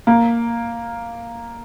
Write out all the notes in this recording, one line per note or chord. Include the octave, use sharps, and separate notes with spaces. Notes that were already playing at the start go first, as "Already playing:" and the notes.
A#3